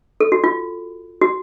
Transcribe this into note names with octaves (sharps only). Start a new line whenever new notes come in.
A4
F#4
F4
F#4